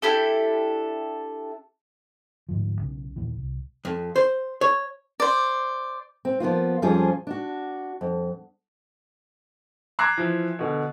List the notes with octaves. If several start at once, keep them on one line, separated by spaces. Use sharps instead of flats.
D4 E4 G4 A4
D2 G#2 F3
B1 C#3
D#2 A#2 E3
C2
F2
C5
C#5
C5 D5
C4
F3 A#3 B3 F4
F2 F3 G3 C#4 F4 G#4
D4 F#4
F2
A#5 D6 E6 F#6 G#6 C7
E3 F3
B2 D3